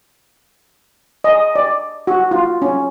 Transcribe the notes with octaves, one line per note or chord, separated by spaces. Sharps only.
D#5
D5
F#4
F4
C#4